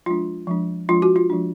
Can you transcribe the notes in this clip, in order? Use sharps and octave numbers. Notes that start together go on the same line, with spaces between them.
F3 G#3 D4 F4
F3 G#3 D4
F3 G#3 D4 F4
F#4
F4
F3 G#3 D4